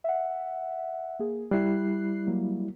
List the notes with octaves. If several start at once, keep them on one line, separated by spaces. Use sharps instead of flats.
E5 F#5
A#3 G#4
G3 E4 F#6 C7
F#3 A#3